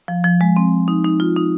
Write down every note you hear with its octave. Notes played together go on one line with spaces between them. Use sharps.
F3
F3
G#3
C4
D#4
D#4
F4
D#4